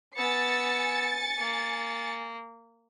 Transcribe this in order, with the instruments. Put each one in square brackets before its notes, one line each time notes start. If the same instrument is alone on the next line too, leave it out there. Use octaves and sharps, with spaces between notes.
[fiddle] B3 E6 [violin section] G#5 A6 C#7
[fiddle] A#3